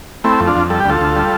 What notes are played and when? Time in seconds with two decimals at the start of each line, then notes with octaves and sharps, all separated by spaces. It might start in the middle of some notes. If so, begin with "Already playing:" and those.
0.24 A3 C4 E4
0.40 F2
0.47 D4 F4
0.56 F2
0.70 G3 A4
0.80 G4
0.85 D2 F4 A4
1.01 D2
1.16 G3